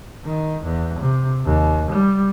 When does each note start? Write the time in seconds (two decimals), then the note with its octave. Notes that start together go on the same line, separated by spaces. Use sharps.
0.25 D#3
0.64 E2
1.00 C3
1.45 D#2
1.92 G3